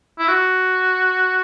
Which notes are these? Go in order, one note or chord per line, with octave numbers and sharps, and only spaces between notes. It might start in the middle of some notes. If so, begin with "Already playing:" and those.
E4
F#4